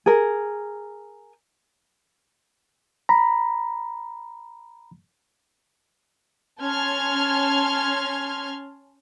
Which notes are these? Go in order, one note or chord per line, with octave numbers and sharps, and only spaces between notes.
G#4 A#4
A#5 B5
C#4 A5 C6 F6 G#6